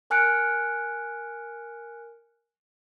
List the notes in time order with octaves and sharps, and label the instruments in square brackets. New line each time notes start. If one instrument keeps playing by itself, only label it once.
[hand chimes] A#4 G#5 F6 F#6 C#7 D7